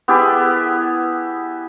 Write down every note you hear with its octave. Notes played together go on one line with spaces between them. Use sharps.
B3 E4 G4 G#4